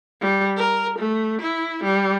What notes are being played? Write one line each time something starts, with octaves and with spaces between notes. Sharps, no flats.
G3
A#4
A3
E4
G3